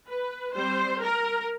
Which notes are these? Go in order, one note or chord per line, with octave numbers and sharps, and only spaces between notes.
B4
G3 C4 C5
A#4